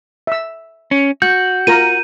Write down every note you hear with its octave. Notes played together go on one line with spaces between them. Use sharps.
E5 E6
C#4
F#4 G6
F4 A#4 A#5 D#7